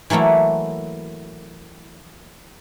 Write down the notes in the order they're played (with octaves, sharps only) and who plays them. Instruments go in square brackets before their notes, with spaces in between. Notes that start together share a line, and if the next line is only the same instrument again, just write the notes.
[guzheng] E3 F#3 A3 A#3 E4